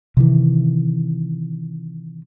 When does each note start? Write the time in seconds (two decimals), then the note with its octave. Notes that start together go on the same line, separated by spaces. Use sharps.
0.17 C3 D#3 E3